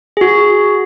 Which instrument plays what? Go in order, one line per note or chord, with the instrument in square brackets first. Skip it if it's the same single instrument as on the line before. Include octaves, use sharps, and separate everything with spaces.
[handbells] F#4 G#4